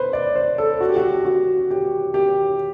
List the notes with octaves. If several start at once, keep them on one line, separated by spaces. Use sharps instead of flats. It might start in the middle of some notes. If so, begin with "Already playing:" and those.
Already playing: B4 C5
D5
C5
A4
F#4
G4
F#4
F#4
G4
G4